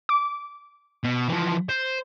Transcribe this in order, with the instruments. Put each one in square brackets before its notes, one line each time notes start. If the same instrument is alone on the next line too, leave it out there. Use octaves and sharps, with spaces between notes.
[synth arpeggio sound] D6
[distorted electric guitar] B2
E3 F3
C5